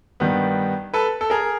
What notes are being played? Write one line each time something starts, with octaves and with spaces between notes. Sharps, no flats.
G2 D#3 G3 B3
A4 B4
A4
G#4 A#4